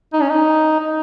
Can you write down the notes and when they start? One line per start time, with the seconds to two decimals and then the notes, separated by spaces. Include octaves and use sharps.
0.13 D#4
0.21 C#4
0.29 D#4
0.79 D#4